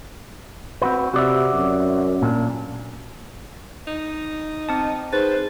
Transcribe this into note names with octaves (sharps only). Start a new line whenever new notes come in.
C4 F#4 B4
C3 F#4 D5 E5
F#2
A#2 D4
D#4
C4 A5
D#4 G#4 B4 C5 A6